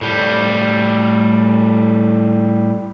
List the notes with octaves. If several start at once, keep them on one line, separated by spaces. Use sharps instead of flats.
A2 G3